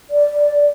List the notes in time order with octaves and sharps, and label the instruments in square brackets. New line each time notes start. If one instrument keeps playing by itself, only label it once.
[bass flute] D5